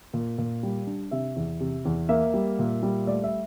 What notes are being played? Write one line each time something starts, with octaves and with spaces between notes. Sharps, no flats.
A#2
A#2
G3
D4
C3 E5
E2
C3
E2
A#3 E5
G3
A#2
G3
A3 D5
E5